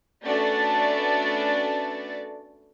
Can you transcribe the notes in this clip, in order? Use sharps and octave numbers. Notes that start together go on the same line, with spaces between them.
A3 B3 C#4 D4 F#4 D5